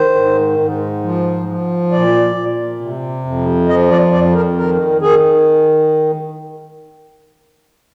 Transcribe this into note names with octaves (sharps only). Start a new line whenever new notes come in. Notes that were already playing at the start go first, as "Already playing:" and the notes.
Already playing: D#3 C5
G#2
G#2
F3
F3
A#2 D5
A#2
C3
F2
F3 D#5
D5
F2 D5
A#4
D#3 A#4
D#3 G#4